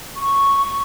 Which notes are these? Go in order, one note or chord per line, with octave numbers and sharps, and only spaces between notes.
C#6